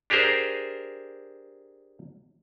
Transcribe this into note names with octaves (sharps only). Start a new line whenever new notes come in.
D4 G4 G#4 A#4 C5